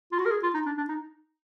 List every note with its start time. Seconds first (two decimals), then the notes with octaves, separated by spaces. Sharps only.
0.12 F4
0.19 F#4
0.26 A#4
0.31 G#4
0.43 F4
0.54 D#4
0.66 D4
0.78 D4
0.89 D#4